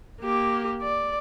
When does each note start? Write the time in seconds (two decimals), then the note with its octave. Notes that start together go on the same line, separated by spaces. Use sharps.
0.21 A#3 G4
0.82 D5